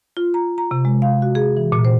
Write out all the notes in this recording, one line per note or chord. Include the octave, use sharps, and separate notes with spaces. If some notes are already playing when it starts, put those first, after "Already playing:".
F4
A#5
A#5
C3
G#3
F5
F#4
G#4
E3
A#2
C5